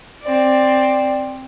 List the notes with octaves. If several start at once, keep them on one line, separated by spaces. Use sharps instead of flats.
C4 D5